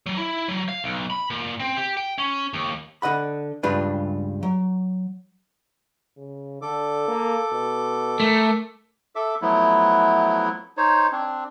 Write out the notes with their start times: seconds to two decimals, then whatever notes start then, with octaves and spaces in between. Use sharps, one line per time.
0.06 F#3
0.17 E4
0.48 F#3
0.68 F5
0.84 B1
1.10 B5
1.30 A#2
1.60 C4
1.77 G4
1.97 G5
2.18 C#4
2.53 D#2
3.02 D3 D#5 F#5 B5
3.63 C#2 G2 G3 D4 F4 B4
4.43 F#3
6.17 C#3
6.62 D3 A4 D6
7.08 A#3
7.52 B2
8.20 A3 A#4
9.16 A4 E5 D6
9.42 F3 F#3 A3 B3 E4
10.77 D#4 C5 C#5
11.12 C4 D4